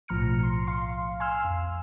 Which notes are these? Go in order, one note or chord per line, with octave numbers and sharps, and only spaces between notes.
B1 A2 F3 A#5 F6 C#7
C6
F5 C6
G#5 C6 E6 F6
F2